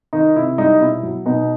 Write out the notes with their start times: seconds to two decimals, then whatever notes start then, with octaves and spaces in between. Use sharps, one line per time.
0.13 D#3 D#4
0.36 C3 E4
0.58 G3 D#4
0.81 B2 E4
1.03 F#3
1.26 B2 D#4